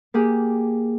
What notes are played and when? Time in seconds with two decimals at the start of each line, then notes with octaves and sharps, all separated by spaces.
0.14 A#3 G4 G#4